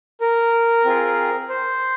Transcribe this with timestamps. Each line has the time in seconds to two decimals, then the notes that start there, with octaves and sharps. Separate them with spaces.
0.21 A#4
0.85 C4 F4 G#4
1.49 C5